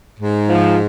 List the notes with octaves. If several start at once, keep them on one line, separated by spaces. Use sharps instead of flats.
G#2
F3